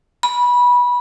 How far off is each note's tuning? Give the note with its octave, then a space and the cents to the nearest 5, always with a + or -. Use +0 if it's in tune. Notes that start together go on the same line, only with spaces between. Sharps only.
B5 -20